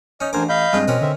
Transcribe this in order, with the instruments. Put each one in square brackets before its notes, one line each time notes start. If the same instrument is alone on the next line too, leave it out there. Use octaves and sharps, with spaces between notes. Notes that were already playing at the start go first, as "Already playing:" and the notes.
[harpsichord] C#4 D#4 [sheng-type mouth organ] D#5
[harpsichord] A1 A#5 D6 [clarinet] D4 [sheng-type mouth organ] A#4 C5 G#5
[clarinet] D#5 [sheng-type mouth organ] F5 B5 G6
[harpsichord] G2 G#3 F4 [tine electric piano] G3 C4
[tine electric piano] B2 [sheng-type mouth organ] C4 [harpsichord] C#4 A#4 B4
[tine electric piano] D3 [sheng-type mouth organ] C4 E5